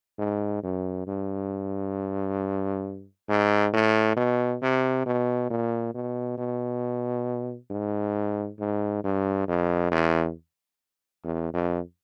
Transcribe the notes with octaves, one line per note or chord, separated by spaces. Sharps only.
G#2
F#2
G2
G#2
A2
B2
C3
B2
A#2
B2
B2
G#2
G#2
G2
F2
E2
E2
F2